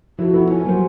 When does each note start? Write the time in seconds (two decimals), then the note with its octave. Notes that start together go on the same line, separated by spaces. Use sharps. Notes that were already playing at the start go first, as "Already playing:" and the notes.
0.19 F3 E4 F#4 A4
0.33 B3 E4
0.51 C#5 G#5
0.65 F#3 G3 A#3 C5